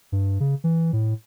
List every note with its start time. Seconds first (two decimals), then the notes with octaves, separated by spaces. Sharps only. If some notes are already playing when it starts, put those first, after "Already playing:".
0.12 G2
0.40 C#3
0.64 E3
0.93 A2